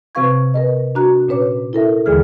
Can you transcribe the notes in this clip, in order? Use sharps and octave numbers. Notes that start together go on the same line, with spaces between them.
C3 C4 B4 F5 C#6 G#6
A#4 B4 D#5
D4 F#4 A#5 F#6
A#2 C#4 B4 C#5 D6
E4 A4 A#4 E5
D#2 D3 E3 G#3 G#4 F6